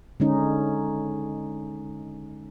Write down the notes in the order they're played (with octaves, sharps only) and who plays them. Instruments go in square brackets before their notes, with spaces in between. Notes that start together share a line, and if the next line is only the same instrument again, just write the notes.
[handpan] D3 G#3 C#4 D#4